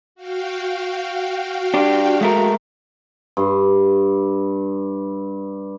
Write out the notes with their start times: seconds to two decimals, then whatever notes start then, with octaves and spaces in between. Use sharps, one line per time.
0.15 F#4 F5 G5
1.74 D4 G4
2.21 G#3 A3 A#4
3.37 G2 C6